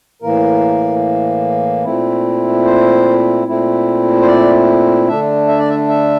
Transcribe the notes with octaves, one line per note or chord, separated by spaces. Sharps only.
A2 E3 A#3 A#4
A#2 A3 C4 E4
C5
A#2 A3 C4 E4
C5
D5
D3 A3 D4 E5
E5
D5
E5
E5